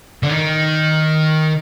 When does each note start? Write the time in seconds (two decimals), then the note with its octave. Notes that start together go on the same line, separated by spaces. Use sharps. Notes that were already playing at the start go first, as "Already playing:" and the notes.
0.23 D3
0.30 D#3